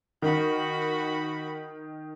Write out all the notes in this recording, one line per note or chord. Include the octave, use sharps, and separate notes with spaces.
D#3 F#4 B5